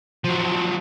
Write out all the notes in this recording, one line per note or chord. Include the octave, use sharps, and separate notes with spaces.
F3 F#3